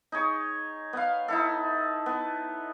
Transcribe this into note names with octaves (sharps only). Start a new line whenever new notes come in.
D#4 G#4 C#5
B3 F5
D#4 E4 A4
B3